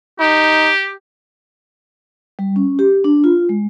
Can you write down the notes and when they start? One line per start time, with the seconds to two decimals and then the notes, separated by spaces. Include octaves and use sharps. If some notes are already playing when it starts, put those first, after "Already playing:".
0.20 D#4 G4
2.39 G3
2.56 C#4
2.79 G4
3.04 D4
3.24 F4
3.49 G#3